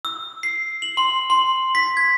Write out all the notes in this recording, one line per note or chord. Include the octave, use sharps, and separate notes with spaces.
E6
C7
F#7
C6
C6
B6
G#6